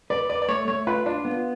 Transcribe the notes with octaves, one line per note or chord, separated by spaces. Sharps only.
B4 D5
B4 D5
D5
A3 C#5
A3 C#5
F4 B4
D4 F4
B3